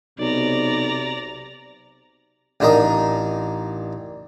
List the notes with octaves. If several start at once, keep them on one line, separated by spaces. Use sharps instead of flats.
B1 C3 D5 A#5
A1 D4 D#4 A#4 A#5 D#6